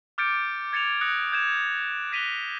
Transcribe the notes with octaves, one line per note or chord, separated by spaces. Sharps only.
D6 F6 G6 A6 C#7 D7
G#6 A6 C#7 E7 F7
D#6 F#6 A#6 C#7
G6 G#6 E7
F#6 A#6 B6 D#7 F7 G7